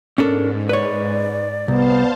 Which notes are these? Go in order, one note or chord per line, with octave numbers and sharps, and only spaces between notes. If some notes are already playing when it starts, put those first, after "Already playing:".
G#2 C#4 D4 A4 A#4
B4 C#5 D5
C2 B3 C5 F5 A5